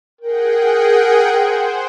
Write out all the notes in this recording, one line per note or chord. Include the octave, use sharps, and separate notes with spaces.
G#4 A#4 F#5 G5
C5